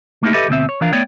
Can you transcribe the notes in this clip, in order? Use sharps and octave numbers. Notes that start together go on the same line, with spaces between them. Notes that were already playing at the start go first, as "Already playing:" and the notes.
A3 A#3 D#4 E4 G4
G4 A4 B4 D#5 E5
D2 B2 F3 C4 E5
C#5
E3 F3 D4 A#4 F5
A3 B3 C#5 D5 G5